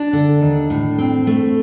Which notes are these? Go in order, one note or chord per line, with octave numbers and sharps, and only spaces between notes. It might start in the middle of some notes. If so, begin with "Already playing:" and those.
Already playing: D4
D3
D#2
A2
C4
A3